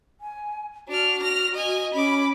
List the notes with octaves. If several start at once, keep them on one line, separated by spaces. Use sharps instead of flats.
G#5
D4 F#4 F6
F6 A#6
D#5 G#5
C#4 B5 D6